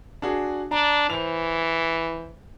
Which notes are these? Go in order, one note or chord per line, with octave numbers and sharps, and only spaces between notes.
D4 F#4 G#4
D4 A#5
E3 C5 F7